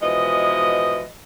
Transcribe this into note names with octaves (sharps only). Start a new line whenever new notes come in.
B2 E3 F3 G#3 D#5